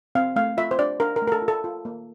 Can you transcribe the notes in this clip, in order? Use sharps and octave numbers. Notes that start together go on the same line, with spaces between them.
C4 F5
A3 F5
F4 E5
C5
D4 D5
D4 A#4
A#4
A3
A#4
A4
F4
A4
F4
A#3